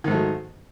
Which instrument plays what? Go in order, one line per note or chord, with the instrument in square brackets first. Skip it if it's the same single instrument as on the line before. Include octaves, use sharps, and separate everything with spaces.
[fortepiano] D#3
G#2
A3
F#3